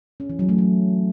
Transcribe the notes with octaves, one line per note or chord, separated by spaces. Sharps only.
C#4
E3
F#3
A3
F#3